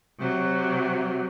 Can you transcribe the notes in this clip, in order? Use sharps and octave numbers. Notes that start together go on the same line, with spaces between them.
C3 F#3